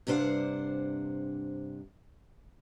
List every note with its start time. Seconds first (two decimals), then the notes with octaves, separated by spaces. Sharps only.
0.07 G2 C3 D4 C5 F5 F#5